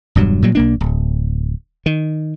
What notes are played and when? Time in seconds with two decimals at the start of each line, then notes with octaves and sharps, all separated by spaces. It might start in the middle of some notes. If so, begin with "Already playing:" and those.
0.15 E1 G2 F#3
0.42 A#2 F#3 G3
0.55 B1 A#3 D4
0.80 D1
1.86 D#3